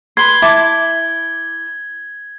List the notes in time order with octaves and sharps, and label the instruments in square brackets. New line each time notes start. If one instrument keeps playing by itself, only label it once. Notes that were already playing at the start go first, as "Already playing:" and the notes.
[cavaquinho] B4 C6 [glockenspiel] G#6 G7
[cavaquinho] E4 A5 D6